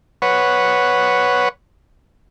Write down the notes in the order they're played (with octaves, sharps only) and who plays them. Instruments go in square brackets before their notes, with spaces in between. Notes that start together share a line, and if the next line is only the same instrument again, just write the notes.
[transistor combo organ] B4 C#5 F#5